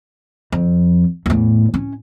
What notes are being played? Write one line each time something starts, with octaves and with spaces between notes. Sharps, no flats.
F2
E2 A2
C#4